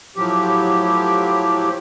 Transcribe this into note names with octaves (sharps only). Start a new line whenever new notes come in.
A2 F3 F#3 G4